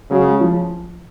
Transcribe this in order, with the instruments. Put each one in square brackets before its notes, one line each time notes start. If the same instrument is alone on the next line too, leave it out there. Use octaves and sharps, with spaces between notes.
[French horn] C#3 [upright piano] F#3
[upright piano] G#3
F3